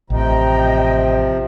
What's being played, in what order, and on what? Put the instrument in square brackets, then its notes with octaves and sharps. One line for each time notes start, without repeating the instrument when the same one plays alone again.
[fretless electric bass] A1 [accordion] C3 F3 [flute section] D#5 G5 [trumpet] A#5